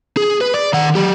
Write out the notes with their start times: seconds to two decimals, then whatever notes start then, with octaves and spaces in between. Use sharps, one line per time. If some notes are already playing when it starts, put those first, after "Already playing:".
0.17 G#4
0.41 B4
0.54 D5
0.73 D#3 F#5
0.95 F#3 G4